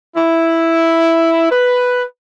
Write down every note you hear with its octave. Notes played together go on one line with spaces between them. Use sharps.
E4
B4